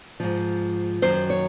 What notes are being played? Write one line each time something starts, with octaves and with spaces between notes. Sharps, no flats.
G#2 F3
F#2 D#3 F#3 C5
C#5